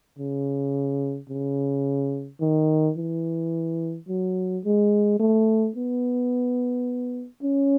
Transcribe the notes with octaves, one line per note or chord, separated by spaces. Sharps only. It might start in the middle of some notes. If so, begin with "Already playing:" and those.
C#3
C#3
D#3
E3
F#3
G#3
A3
B3
C#4